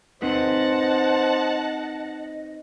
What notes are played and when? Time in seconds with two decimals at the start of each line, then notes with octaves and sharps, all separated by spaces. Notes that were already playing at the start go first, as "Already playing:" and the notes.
0.22 C4 D#4 B4 C5 D#5 F#5 A5